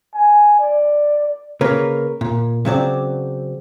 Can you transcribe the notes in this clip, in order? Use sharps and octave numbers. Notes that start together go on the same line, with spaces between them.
G#5
D5
C#3 A#3 A#4 B4 C#5
A#2
C#3 F#3 C4 D5